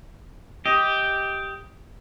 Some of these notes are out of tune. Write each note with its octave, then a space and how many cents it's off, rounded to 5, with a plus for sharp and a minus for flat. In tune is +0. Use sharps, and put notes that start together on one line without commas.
G4 +0 D#5 +20